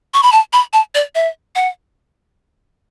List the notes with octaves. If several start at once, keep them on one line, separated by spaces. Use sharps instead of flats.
C#6
B5
A5
B5
A5
D5
E5
F#5